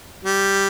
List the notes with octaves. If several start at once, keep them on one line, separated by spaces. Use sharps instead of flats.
G3